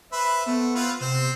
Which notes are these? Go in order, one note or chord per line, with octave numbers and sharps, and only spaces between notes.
B4 C5 E5 B5
A3 B3
C4 F4 B4
C3 C4 C5